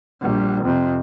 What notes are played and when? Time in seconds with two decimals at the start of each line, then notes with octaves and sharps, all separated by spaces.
0.22 A#1 G3
0.64 F2 C3